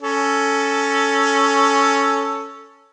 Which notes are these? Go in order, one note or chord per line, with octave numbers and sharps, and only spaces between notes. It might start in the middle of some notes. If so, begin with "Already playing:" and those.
C#4 A4